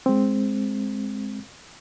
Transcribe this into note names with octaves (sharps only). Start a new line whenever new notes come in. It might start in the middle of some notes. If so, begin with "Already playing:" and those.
G#3 C4